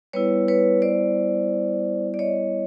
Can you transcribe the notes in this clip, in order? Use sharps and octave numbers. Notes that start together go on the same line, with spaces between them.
G3 B3 E4 B4 C#5
B4 C#5
C5 D5
D5
C#5 D#5